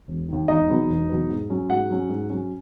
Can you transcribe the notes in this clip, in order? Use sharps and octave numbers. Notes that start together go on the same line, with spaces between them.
E1
D#2 D#3
E1 D#4 D#5
E2 B2 F#3 B3
E1
E2 B2 F#3 B3
G#2
F#3 C#4
G#2 F#4 F#5
F#3 C#4
G#2
F#3 C#4